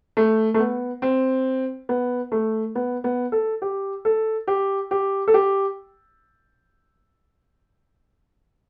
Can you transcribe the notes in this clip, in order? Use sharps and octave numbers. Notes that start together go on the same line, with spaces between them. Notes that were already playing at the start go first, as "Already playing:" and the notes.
A3
A3
B3
C4
B3
A3
B3
B3
A4
G4
A4
G4
G4
A4
G4